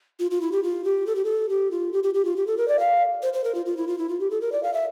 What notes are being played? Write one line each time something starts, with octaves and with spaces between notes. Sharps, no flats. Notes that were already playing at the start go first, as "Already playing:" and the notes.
F4
F4
E4
G4
F4
G4
A4
G4
A4
G4
F4
G4
G4
G4
F4
G4
A4
A#4
D5
F5
C5
C5
A#4
F4
F4
E4
F4
E4
F4
G4
A4
A#4
D5
F5
E5